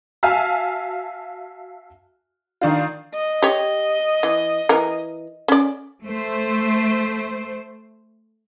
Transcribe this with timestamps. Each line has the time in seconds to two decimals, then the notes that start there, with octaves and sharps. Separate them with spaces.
0.23 F#4 E5 F5 G#5 A5 F6
2.61 D#3 D4 F4
3.14 D#5
3.42 G4 C#5
4.23 E3
4.69 E3 A#4
5.48 C#4 D5
6.04 A3 C5